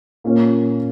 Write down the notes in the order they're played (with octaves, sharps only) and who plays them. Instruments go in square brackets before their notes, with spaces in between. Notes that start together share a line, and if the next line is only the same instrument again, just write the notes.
[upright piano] A#2 A#3 C#4